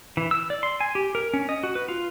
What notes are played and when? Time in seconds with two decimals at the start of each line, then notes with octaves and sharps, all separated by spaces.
0.17 E3
0.31 E6
0.50 D5
0.63 C6
0.81 G#5
0.95 G4
1.15 A#4
1.34 C#4
1.49 D#5
1.63 F#4
1.75 B4
1.89 F4